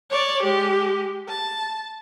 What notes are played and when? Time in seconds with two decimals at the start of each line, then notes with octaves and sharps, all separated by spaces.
0.11 C#5 D5
0.43 G#3 G4
1.29 A5